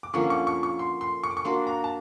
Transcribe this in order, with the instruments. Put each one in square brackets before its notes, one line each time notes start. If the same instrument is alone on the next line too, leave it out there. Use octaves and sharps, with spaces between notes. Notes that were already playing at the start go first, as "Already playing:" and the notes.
[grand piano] D6
[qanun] D3 F3 A#3 C#4 [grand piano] C#6
[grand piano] C#6
C#6
C#6
C6
C6
C#6
D6
C#6
[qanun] A#3 D4 F#4 [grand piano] C6
[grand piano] A#5
A5